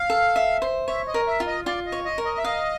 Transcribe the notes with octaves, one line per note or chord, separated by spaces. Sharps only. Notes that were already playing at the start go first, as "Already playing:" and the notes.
Already playing: F5
A4
E5
C5
C#5 E5
D#5
A#4
E5
F4
D#5
F4 D5
D#5
C#5
D#5
A#4
D#5
E5
D#5 F5